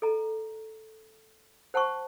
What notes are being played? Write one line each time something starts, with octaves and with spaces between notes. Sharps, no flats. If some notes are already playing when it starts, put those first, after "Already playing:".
A4 D#5 A#5
C5 F#5 A5 C#6